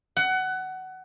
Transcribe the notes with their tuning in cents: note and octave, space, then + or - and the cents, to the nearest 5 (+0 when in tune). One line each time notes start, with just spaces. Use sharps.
F#5 +20